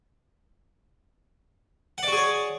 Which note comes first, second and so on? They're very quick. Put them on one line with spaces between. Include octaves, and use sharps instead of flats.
F#5 D5 F#4 G#4 C#5